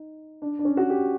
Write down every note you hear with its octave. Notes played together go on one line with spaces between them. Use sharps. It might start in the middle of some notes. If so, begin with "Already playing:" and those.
Already playing: D#4
D4
D4
C#4
F#4
G4